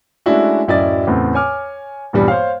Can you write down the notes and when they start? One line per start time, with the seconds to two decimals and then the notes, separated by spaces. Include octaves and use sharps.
0.26 G#3 A3 C#4 D4 E4 F#4
0.67 D1 F#2 E4 D5 D#5 A6
1.07 E2 A2 C#3 C4
1.35 C#5 G#5 D6 F6
2.13 D#1 G2 E3 G3 B3
2.28 C5 C#5 F5